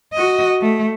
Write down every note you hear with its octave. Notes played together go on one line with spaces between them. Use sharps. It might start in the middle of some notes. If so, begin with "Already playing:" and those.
F#4 D#5
A3